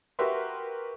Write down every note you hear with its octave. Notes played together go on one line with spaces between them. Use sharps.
F#4 G4 A#4 B4 E5 C6